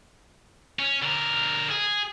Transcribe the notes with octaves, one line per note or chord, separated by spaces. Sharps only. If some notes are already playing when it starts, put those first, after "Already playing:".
C#4
D3 A#4
G#4